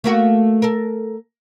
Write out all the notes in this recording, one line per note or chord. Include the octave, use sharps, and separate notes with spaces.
A3 A#3 F#4
A4 A#4